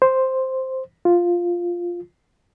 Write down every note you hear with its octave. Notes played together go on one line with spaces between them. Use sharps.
C5
F4